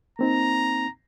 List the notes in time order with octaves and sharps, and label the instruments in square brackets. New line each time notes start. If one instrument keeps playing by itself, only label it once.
[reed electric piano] A#3 C4 D#4 [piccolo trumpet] A#5